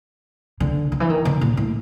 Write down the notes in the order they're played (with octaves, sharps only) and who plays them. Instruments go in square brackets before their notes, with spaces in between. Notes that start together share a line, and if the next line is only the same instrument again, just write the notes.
[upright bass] D3
D#3
E3
D#3
D3
A#2
A2